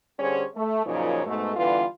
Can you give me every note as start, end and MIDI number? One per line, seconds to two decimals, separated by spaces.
0.18 0.43 50
0.18 0.43 55
0.18 0.43 61
0.18 0.43 68
0.18 0.43 72
0.18 0.43 73
0.55 0.83 57
0.84 1.24 42
0.84 1.24 46
0.84 1.24 49
0.84 1.24 53
0.84 1.24 63
0.84 1.24 73
1.26 1.52 44
1.26 1.52 47
1.26 1.52 57
1.56 1.83 50
1.56 1.83 52
1.56 1.83 55
1.56 1.83 59
1.56 1.83 65
1.56 1.83 71